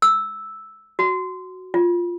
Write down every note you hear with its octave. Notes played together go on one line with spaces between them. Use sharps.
E6
F#4
F4